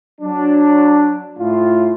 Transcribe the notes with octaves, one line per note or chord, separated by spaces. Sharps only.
F#3 D4
A2 F4